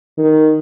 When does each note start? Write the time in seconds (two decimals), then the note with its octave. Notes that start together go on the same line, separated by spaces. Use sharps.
0.17 D#3